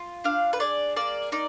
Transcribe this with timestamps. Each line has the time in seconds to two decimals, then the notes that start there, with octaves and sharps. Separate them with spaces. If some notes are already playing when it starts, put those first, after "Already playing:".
Already playing: F4
0.24 D4 F5
0.53 B4
0.60 G#4 D5
0.97 A#3 D5
1.32 D#4 D5